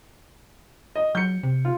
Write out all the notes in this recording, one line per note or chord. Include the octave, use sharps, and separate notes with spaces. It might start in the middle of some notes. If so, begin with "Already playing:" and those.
D#5
F#3 G6 C#7
C3
F4